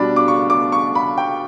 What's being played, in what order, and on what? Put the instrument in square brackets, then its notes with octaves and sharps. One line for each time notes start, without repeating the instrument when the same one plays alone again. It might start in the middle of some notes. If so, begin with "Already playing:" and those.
Already playing: [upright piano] B2 G3 D4 B5
D6
C#6
D6
C#6
B5
G5